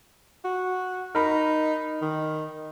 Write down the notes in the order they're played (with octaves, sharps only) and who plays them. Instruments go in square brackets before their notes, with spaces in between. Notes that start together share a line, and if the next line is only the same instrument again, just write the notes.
[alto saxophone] F#4
[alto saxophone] D#4 [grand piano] A#4 B5
[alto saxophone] D#3